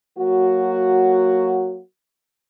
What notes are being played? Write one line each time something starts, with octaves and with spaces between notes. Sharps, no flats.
F#3 A#3 F#4